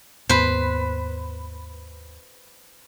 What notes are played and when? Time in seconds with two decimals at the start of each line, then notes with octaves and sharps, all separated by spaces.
0.29 D#2 G#2 B3 B4 C5